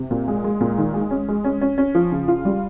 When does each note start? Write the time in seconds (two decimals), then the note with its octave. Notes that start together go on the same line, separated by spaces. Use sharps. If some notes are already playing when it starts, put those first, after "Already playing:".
Already playing: C3
0.11 A#2
0.28 G#3
0.44 G#3
0.61 A#2
0.78 D#3
0.94 G#3
1.11 C#4
1.28 G#3
1.44 C#4
1.61 C#4
1.78 C#4
1.95 F3
2.12 C#3
2.28 F4
2.45 G3